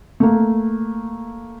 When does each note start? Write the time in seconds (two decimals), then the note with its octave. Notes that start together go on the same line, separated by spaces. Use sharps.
0.20 A3 A#3